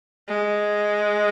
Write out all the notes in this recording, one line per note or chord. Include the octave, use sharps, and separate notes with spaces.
G#3